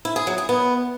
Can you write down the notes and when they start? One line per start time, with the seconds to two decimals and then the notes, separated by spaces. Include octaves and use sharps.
0.05 E4
0.16 G#4
0.27 F#3
0.38 G#4
0.49 B3